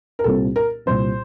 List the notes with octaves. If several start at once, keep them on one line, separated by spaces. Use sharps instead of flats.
A#4
C2 A#2 G3 C4 A4
A#4
C2 A#2 G3 C4 C5